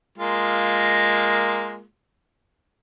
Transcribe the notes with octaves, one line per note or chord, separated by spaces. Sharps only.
G#3 A#3 F4